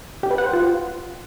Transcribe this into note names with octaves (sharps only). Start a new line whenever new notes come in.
G4
B4
F#5
C5
F4